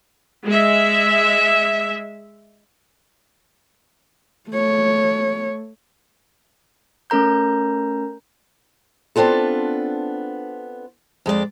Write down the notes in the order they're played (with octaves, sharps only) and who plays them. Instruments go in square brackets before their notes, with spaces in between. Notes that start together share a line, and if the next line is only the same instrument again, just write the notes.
[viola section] G#3 E5
[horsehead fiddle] A3 C#5
[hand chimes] A3 C#4 A#4 A#5 G6
[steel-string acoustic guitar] B3 C4 D4 F4 A4
F2 G#3 F#4 D5